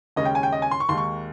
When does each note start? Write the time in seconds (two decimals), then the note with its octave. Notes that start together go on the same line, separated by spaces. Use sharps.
0.16 D#2 C#3 G#3 C#4 D#5
0.25 G5
0.35 G#5
0.43 G5
0.52 D#5
0.62 G#5
0.71 C6
0.80 C#6
0.89 D#2 D#3 G#3 C6
0.98 C#6